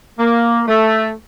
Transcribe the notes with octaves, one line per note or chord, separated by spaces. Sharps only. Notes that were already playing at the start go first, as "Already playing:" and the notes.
A#3
A3